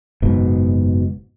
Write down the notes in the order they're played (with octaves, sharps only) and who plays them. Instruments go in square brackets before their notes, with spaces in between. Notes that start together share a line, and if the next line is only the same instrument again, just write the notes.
[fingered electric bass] F#1 G#2 B2